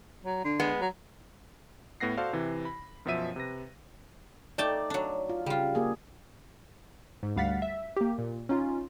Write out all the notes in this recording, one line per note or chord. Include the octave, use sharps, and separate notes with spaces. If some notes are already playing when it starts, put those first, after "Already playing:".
F#3
D3
G#3 B3
F#3
A2 B3 F#5 A#6 C7
F#4 A4 C5 D5 F5
C3 E3 E4
B5
F#2 B2 F3 C#4 E5 D#7
C3 B4 A#6
A3 D#4 D5 G5 A5
F#3 D4
F4
C#3 G3 F4
A#3 G4 G#4
G#2
D2 G3 F5 F#5 A6 B6
E5
A#3 G4
A#2
C#4 D#4 F4